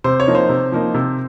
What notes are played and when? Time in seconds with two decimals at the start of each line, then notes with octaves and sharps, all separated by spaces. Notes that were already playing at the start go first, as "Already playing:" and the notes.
0.04 C3 C5
0.20 C#5
0.27 F3 A#3 D#4
0.35 C5
0.49 C3
0.72 F3 A#3 D#4
0.94 C3